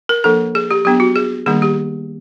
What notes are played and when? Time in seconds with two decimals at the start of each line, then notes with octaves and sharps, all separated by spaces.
0.09 A#4
0.24 F3 A#3 D4 A4
0.55 G#4
0.71 G4
0.85 F#3 B3 D4 G4
1.00 F#4
1.16 G#4
1.46 D#3 G3 A#3 D4 G#4
1.62 G4